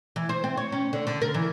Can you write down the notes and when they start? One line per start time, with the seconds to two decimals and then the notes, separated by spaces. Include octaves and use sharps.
0.16 E3
0.29 C5
0.44 C4
0.57 C#5
0.72 C#4
0.93 D3
1.07 D3
1.22 A#4
1.34 E3